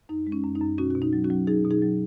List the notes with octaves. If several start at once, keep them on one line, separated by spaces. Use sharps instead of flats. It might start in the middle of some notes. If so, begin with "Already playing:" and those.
F#2 D#4
G#3
C#4
F#2
D#4
F#2
B2 C#4 F#4
B2 F#4
D#4
F#3
C#4 F#4
F#3
F#3 D#4 G#4
B2
D#4 G#4
F#3